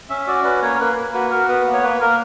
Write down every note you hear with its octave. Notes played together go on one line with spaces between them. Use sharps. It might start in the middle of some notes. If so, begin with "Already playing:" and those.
C#4 E5
E5
F#4 D5
C#4 B4
A#3 C#5
A#4
A#3 B4
A#3
F#4 B4
F#4 A#4
B3 B4
A#3
C#5
A#3 B4
A#3 A#4